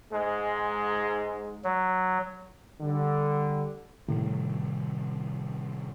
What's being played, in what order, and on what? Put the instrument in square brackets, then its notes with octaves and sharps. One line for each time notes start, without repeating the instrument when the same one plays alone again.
[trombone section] G#2 G#3
[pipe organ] F#3
[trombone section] D3 G3
[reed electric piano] A2 [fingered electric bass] C3 D#3 G3